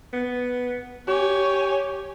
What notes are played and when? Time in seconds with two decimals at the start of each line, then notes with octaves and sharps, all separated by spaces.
0.13 B3
1.08 G4 C#5 G#5